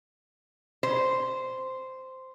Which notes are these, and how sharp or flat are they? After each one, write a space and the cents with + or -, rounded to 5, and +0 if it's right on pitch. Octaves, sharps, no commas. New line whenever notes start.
C5 -5